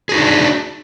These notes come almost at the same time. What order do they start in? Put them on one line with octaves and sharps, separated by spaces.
G#4 F#4 D#4 D4